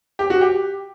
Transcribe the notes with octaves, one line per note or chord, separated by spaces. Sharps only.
G4
F#4
G4